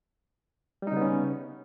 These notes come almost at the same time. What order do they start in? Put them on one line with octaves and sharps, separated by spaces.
G3 D#4 C#3 B3 C#4